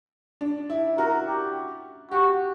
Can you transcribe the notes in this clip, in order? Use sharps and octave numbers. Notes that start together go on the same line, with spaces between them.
D4
E4
F#4 A#4
G4
F#4 G4